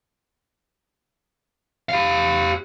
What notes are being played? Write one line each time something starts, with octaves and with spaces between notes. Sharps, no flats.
G4 F5